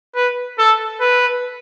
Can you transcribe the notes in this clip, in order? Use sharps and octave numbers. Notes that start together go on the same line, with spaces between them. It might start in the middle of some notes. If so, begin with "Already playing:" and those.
B4
A4
B4